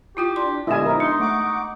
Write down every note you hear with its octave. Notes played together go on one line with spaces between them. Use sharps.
E4 F4 G4 G5
D4 C6
A#2 D3 G#3 B3 E4 G4 D#5 G#5
F3 D#4 A#4 E5
D4 D#4 C6
A3 F#5 C#6 D6